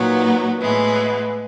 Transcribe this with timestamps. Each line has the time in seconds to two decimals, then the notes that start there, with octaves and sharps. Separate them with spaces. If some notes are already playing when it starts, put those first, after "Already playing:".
Already playing: A#2 F#3 B3 D#4
0.60 A2 E3 G#3 B3